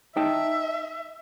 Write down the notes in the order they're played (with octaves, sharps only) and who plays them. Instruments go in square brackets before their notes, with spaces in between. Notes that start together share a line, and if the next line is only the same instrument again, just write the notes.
[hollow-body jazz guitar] D#4 G5 A5 [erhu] E5